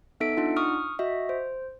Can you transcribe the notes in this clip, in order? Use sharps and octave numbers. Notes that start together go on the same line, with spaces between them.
B3 D#4 A4 E5 B6 D7
D4 D#4 F4 F#5
C#6 D#6 F6
F#4 D#5 E5
C5